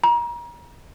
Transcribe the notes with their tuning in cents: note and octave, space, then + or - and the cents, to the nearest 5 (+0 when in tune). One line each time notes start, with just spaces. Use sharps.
A#5 +30